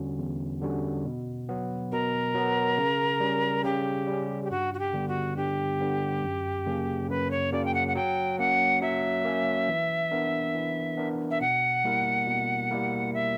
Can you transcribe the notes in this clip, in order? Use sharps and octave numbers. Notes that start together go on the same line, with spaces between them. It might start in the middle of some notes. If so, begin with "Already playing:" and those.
Already playing: E2 D3 G3 C#4 F#4
E2
D3 G3 C#4 F#4
B2
F#3 B3
B2 A#4
F#3 B3
C#3
G3 C#4
C#3 G4
G3 C#4
G4
G2 F#4
F#4
G4
D3 G3 B3
F#4
G2 G4
D3 G3 B3
F#2
C#3 F#3 A#3 C#4
F#2 B4
C#5
C#3 F#3 A#3 C#4 D5
G5
F#5
F#5
F#3 G5
A#3 C#4 F#5
F#3 E5
A#3 C#4
E3
B3 D4 A#4
E3
B3 D4 A#4
E5
B2 F#5
G3 A#3 E4 A#4
B2
G3 A#3 E4 A#4
E5